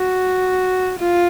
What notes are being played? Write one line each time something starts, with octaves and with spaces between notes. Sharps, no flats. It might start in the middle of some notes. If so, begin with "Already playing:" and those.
Already playing: F#4
F4